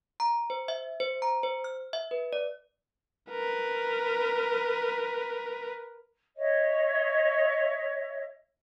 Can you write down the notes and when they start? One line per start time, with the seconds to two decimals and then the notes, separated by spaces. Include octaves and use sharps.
0.20 A#5
0.50 C5
0.68 E5
1.00 C5
1.22 A#5
1.43 C5
1.64 F6
1.93 E5
2.11 B4
2.33 D5
3.31 A#4 B4
6.37 C#5 D#5 E5